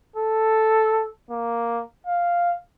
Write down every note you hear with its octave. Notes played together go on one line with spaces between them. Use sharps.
A4
A#3
F5